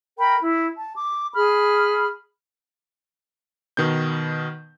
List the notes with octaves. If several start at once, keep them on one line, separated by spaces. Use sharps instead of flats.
A#4 G5 B5
E4
A5
D6
G#4 B5 F6
B2 D#3 B3 G6